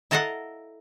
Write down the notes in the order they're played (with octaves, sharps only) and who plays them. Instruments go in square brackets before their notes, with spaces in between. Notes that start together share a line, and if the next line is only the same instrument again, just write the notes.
[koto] E4 A4 A#4 D#5 F5 F#5